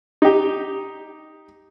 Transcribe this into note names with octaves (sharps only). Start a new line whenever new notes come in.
D#4 G4